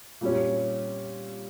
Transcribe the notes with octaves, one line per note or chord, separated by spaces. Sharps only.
A#2 G3 C#4